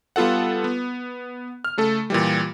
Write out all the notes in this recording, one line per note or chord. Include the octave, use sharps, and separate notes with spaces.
G3 B3 F4 A4 F#5
B3
F6
C#3 A3 A4
A#2 E3 G3